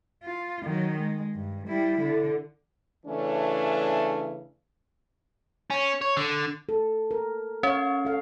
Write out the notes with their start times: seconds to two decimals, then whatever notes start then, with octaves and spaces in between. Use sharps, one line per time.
0.24 F4
0.63 D#3 F#3
0.99 G#3
1.35 G2
1.68 G3 E4
2.01 D3
3.06 C#3 E3 A3 C#4 D4
5.70 C#4
6.02 C#5
6.17 D3
6.69 A4
7.11 A#4
7.63 C#4 C#5 F5
8.05 A4 F5